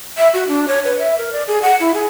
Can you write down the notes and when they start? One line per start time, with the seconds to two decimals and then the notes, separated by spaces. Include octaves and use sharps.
0.17 E5
0.34 F#4
0.48 D4
0.68 C#5
0.85 B4
0.99 E5
1.18 A#4
1.32 D5
1.48 G#4
1.62 F#5
1.80 E4
1.94 G#4